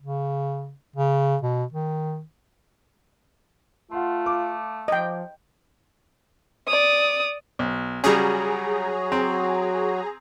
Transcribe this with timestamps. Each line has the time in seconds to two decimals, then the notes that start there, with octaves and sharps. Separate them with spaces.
0.02 C#3
0.96 C#3
1.43 B2
1.73 D#3
3.91 A3 F4 F#5 C6
4.26 F5 D6
4.88 F3 D#5 G5
6.67 D5 D#6
7.59 B1
8.04 C#3 F#3 G3 F#4 G#4 A#5
9.12 C4